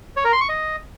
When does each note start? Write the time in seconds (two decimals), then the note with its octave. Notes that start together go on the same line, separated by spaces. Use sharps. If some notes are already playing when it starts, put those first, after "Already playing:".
0.16 C#5
0.25 A#4
0.33 C6
0.41 C#6
0.49 D#5